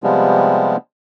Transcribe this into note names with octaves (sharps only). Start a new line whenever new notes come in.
C3 F3 G3 G#3 B3